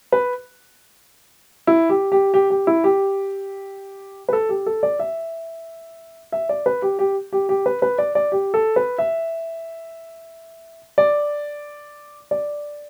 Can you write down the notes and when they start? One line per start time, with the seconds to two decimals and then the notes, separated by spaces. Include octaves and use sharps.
0.12 B4
1.67 E4
1.89 G4
2.12 G4
2.34 G4
2.50 G4
2.67 E4
2.84 G4
4.29 B4
4.33 A4
4.49 G4
4.66 A4
4.83 D5
4.99 E5
6.32 E5
6.49 D5
6.66 B4
6.82 G4
6.99 G4
7.33 G4
7.49 G4
7.66 B4
7.82 B4
7.98 D5
8.15 D5
8.32 G4
8.54 A4
8.76 B4
8.98 E5
10.98 D5
12.31 D5